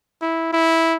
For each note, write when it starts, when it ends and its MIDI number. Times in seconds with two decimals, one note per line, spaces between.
0.22 0.50 64
0.53 0.97 64